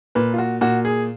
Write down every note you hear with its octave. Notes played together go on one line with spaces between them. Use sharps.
A#2 B4
F4
F#4
A#2 F#4
G#4